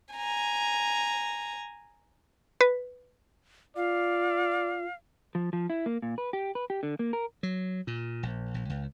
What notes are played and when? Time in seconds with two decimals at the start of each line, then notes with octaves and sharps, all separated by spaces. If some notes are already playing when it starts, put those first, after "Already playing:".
0.15 G#5 A#5
2.61 B4
3.76 F4 D5 F5
5.35 F3
5.53 F3
5.70 E4
5.86 A#3
6.02 A#2
6.18 B4
6.33 G4
6.55 B4
6.70 G4
6.83 D3
6.99 A#3
7.13 A#4
7.43 F#3
7.87 A#2
8.23 A#1
8.54 A#1
8.70 C#2